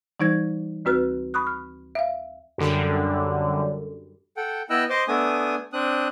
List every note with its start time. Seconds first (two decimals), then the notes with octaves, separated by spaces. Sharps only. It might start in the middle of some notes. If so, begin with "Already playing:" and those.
0.20 E3 G3 D#4 C5 G#6
0.85 D2 C4 F#4 B4 F6 F#6
1.34 B5 C#6 D#6 F#6
1.47 F6
1.95 E5 F5
2.58 F#2 D3 G3
4.37 A4 F#5 G5
4.70 B3 E4 D#5 G5 E6 F#6
4.90 C5 D#5 C6 D6
5.08 A3 B3 D4 G#5 D#6
5.73 C4 D4 D#6 F#6